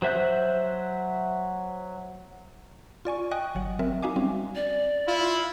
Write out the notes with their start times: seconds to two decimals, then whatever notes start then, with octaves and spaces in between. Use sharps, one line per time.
0.02 F#3 C5 E5 F#6 G6
3.05 F4 D5 G#5 C#6
3.31 D#5 G5 G#5 C#6 D#6 F#6
3.55 G1 F#3 F#5
3.79 F#3 C4 A#4 E5
4.02 D#4 F#4 E5 F5 G#5 D6
4.16 G3 C4 C#4
4.56 D5
5.07 E4 F4